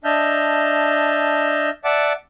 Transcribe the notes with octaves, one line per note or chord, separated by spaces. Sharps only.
D4 D#5 E5 A5 F6 G6
D5 E5 F#5 A5 D6